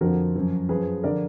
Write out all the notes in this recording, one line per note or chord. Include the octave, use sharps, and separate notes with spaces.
F2 D3 F3 F#4 A#4
F#2 F3
F#2 F3 G#4 B4
D3 F3 A#4 D5